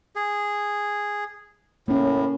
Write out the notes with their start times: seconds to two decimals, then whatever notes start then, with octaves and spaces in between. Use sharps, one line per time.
0.16 G#4
1.88 A2 A#3 C#4